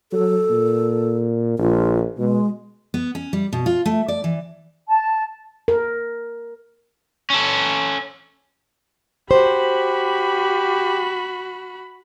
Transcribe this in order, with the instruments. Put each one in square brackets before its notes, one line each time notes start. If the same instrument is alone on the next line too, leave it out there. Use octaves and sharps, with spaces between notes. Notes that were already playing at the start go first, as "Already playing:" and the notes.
[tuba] F#3 [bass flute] A4
[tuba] A#2
[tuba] A#1 [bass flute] F4
[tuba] B2 [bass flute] G#3
[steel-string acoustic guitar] B3
C#4
G3
B2
F4
A3
D5
E3
[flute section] A5
[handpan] A#4
[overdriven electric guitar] C#4 A4
[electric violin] F#4 B5 [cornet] G4 [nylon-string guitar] C5